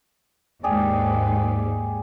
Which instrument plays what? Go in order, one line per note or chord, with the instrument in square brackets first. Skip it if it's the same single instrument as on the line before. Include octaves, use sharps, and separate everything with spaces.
[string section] D#2 G#2 [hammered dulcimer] G4 G#4 D5